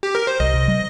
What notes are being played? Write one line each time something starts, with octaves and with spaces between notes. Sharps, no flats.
G4
A#4
C5
C2 D#5
C3
G3